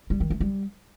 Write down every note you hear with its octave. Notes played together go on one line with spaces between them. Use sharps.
G3
D#3
A3
G3